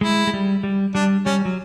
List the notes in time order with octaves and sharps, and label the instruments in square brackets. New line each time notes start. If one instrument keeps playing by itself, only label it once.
[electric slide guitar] G#3 [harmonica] E4
[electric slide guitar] G#3
G3
G3
[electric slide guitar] G3 [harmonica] D4
[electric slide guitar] G3 [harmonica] C#4
[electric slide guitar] F#3